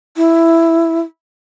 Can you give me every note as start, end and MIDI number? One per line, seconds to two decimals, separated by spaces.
0.17 1.00 64